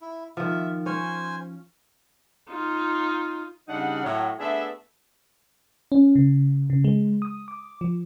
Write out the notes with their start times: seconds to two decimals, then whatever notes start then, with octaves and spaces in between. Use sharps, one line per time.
0.01 E4
0.37 D#3 F3 E5
0.86 C#4 C5 G#5
2.50 D#4 F4
3.68 C#3 G3 D4 D#4 F#5
4.04 A2 F#3
4.39 A3 B3 D4 G#4 E5
5.92 C#4
6.15 C#3
6.70 C#3
6.84 G#3
7.22 D#6
7.48 D6
7.81 F3